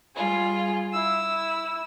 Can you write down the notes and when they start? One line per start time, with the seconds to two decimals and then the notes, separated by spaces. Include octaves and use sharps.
0.15 G3 F4 G#4
0.91 E4 E6